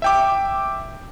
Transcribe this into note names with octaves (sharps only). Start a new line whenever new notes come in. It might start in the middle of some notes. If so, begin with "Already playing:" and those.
E5 G5 D6